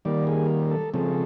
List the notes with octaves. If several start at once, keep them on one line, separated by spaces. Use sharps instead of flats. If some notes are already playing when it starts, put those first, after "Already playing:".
D#3 G3 A#3 D5
G#4
A4
C#3 F3 G#3 C4 A4